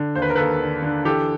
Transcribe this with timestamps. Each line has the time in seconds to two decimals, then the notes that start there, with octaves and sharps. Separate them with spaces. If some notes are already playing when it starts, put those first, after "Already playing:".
Already playing: D3
0.15 D#2 C5
0.22 B4
0.30 A#4
0.35 D#2 A4 B4
0.61 D3
0.82 D3
1.05 E3 G4 A4